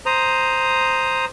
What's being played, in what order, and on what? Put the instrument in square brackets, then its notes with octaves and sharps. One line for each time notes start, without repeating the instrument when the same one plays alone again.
[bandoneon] C5 A#5 D#6